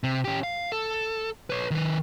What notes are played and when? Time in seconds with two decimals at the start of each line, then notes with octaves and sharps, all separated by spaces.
0.04 C3
0.24 C#4 G4
0.43 F5
0.72 A4
1.50 B4 C#5
1.71 D#3 B4